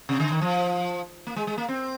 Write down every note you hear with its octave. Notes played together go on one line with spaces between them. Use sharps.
C3
D3
D#3
F3
A#3
G#3
G#3
A#3
C4